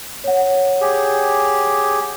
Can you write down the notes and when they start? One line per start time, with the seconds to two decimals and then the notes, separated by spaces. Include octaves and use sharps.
0.24 C#5 F#5
0.81 G4 G#4